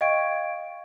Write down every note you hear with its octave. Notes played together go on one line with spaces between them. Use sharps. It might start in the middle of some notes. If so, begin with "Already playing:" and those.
D#5 F5 G5 C#6 G#6 D7